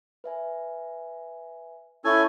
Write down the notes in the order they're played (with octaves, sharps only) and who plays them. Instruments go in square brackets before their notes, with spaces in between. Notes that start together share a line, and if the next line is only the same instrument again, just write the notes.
[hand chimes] B4 E5 G#5
[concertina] C#4 A4 G#5 [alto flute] E4 [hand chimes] E6 G6